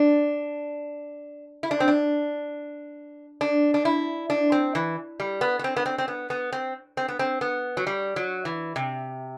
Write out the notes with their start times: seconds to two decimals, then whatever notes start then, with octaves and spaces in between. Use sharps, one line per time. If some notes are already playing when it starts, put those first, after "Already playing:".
Already playing: D4
1.63 E4
1.71 D4
1.80 C4
1.88 D4
3.41 D4
3.74 D4
3.85 E4
4.30 D4
4.52 C4
4.75 E3
5.20 G3
5.41 B3
5.59 B3
5.64 C4
5.77 B3
5.86 C4
5.98 C4
6.08 B3
6.30 B3
6.52 C4
6.97 C4
7.08 B3
7.19 C4
7.41 B3
7.77 F#3
7.87 G3
8.16 F#3
8.45 E3
8.76 C3